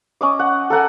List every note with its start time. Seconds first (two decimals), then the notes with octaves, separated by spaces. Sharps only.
0.21 C#4 D#5 D6
0.39 F#5
0.70 A4 A#4 F#5 G#5